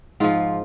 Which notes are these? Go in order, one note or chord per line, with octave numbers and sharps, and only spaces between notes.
G#2 F3 F4